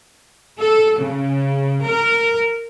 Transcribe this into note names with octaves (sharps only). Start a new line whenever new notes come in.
A4
C#3
A#4